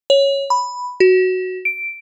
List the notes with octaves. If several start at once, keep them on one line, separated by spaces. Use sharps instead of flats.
C#5
B5
F#4
D7